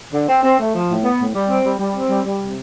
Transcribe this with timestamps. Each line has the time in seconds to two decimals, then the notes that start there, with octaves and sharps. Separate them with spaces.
0.13 D3
0.29 C4
0.43 C4
0.59 A3
0.74 F3
0.89 A2
1.04 B3
1.19 A2
1.35 G3
1.49 C4
1.64 G3
1.79 G3
1.95 C4
2.09 G3
2.25 G3
2.41 C3